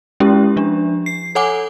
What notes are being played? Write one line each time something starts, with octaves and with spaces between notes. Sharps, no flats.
G#3 C#4 E4 G4
F3 D4
C7
A4 C#5 F#5 G#5 D6